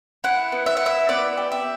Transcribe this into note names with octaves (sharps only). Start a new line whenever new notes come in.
E4 F#5
B3
E5
F#5
E4 E5
B3 D5
G4
E5